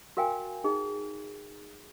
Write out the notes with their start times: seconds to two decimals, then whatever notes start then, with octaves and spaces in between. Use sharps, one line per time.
0.17 F#4 A#4 F5 G5 G#5
0.64 D#4 G#4